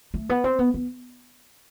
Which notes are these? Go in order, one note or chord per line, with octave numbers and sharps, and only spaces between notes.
A3
B3
C4
B3
B3